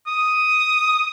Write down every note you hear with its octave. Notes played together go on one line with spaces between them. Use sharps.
D#6